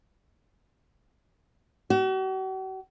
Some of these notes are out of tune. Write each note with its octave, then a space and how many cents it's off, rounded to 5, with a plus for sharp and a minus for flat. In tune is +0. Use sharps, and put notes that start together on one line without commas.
F#4 +45